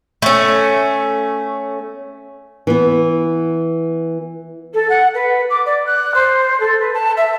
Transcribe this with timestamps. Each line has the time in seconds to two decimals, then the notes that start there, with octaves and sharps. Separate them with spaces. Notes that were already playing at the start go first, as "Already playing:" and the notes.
0.22 A3 C#4
2.67 E3 B3
4.74 A4
4.89 F#5
5.14 B4
5.49 D6
5.65 D5
5.86 F#6
6.14 C5
6.59 A4
6.79 B4
6.93 A5
7.16 E5